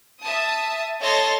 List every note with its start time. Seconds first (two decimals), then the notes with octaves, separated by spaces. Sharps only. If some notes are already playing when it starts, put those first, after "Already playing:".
0.22 E5 A5 D#6
1.00 A4 C#5 D#5 C6 A6 A#6